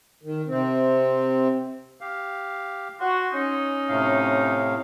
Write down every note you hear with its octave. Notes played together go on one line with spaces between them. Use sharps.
D#3
C3 C4
G4 F5
F#4 C6
C#4 D#4
A2 C3 F5